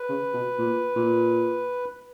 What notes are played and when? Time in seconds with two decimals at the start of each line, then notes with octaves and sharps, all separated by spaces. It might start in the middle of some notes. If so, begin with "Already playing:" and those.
Already playing: B4
0.09 C#3
0.34 B2
0.58 A#2
0.96 A#2